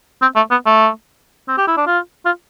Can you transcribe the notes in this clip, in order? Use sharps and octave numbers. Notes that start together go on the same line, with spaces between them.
C4
A3
B3
A3
C4
G4
E4
D4
F4
F4